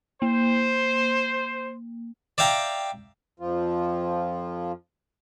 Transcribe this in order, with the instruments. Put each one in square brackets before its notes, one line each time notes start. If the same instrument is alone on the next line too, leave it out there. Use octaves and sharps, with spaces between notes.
[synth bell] A#3 [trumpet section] C5
[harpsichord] D5 E5 F5 G5 A#5
[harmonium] F2 F3 F4